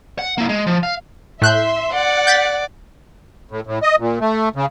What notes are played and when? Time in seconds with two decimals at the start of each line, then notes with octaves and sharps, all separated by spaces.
0.19 F#5
0.38 A#3 E4
0.49 G#3
0.67 F3
0.83 F5
1.42 A2 E5 C6 F#6 G6
1.94 D5 F#5
2.27 G6 A6 B6
3.51 A2
3.67 A2
3.82 D#5
4.00 A#2
4.21 A3
4.56 C#3